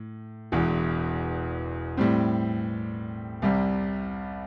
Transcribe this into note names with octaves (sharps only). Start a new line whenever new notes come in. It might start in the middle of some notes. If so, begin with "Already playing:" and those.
Already playing: A2
E1 E2 E3
A2 G3 C4
C2 C3 G3